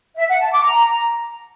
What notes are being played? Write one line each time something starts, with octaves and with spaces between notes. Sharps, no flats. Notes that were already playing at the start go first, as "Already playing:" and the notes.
E5
F#5
A5
D6
A#5